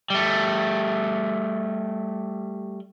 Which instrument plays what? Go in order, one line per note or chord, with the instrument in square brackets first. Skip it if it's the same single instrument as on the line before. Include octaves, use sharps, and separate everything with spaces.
[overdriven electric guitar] G3 A3